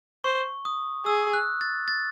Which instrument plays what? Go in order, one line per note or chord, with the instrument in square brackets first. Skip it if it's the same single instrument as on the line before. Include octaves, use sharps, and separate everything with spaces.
[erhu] C5 [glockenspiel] C#6
[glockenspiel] D#6
[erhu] G#4 [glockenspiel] E6
[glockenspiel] F#6
A6
A6